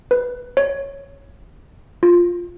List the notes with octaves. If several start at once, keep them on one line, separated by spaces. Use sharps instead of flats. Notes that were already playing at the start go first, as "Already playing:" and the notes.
B4
C#5
F4